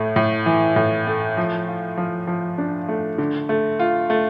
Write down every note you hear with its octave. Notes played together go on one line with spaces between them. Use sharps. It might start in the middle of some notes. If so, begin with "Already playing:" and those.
Already playing: A2 A3
A2
E3
A2
A3
F3
F4
F3
F3
D4
A3
D3
A3
F4
A3